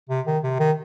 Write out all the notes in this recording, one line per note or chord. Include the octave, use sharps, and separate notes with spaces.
C3
D#3
C3
D#3